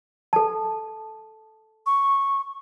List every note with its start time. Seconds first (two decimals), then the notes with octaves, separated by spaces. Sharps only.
0.33 A4 A5
1.86 C#6